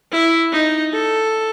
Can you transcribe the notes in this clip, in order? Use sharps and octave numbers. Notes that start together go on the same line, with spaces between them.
E4
D#4
A4